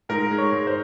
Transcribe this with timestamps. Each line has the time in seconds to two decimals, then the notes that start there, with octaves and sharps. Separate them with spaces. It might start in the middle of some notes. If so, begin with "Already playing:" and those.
0.09 G#2 A#4
0.31 G#3
0.38 C#5
0.52 G#2
0.67 C5